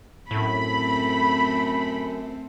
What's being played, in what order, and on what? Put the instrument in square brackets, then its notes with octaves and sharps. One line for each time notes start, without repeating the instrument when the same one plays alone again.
[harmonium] F#2 [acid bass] A2 [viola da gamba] A3 C4 [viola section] B5